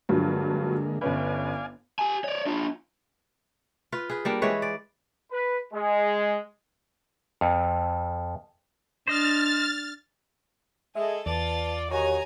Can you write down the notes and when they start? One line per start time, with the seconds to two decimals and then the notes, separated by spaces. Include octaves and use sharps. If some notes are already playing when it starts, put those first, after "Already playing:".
0.09 G2 D3 F3 F#3 G#3 A#3
1.01 G1 C#4 B4 D5 F5 G#5
1.99 G4 G#5
2.24 C#5 D5
2.46 D4 F4
3.92 F4 B4
4.10 G#4 B4
4.25 G3 A#3 D4
4.42 E3 G#3 B4 C#5
4.62 D5
5.32 B4
5.73 G#3
7.41 F2
9.07 D4 C5 D#5 F6 A6
10.95 G#3 G#4 A4 E5
11.26 E2 F4 B4 D5 A5 A6
11.90 D#3 D#4 F#4 G4 C#5 G#5 A#5